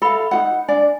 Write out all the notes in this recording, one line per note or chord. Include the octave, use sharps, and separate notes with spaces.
A4 E5 F5 B5
D#4 F4 F#5
D4 D5 G#5